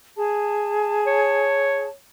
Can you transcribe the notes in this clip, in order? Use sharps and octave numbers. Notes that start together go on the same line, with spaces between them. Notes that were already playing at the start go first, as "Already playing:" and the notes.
G#4 A5
C#5